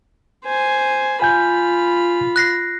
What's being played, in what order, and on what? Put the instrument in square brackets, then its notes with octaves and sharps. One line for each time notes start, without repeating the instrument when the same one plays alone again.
[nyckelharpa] C5 G#5
[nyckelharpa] F4 B5 [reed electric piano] G#5 G6
[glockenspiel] F#6 A#6 C7